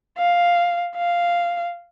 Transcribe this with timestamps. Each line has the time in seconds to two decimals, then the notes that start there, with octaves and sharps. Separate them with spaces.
0.18 F5
0.96 F5